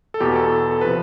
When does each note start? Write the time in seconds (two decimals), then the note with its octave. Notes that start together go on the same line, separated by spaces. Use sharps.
0.14 A4
0.20 E2 B2 G4
0.36 A4
0.71 A4
0.81 C3 F3 B4